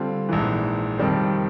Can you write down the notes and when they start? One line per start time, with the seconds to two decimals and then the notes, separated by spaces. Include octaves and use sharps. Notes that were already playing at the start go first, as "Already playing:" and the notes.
Already playing: D3 G3 C4 F4 A4
0.29 A#1 G#2 E3
0.98 F2 C3 D#3 G3 C4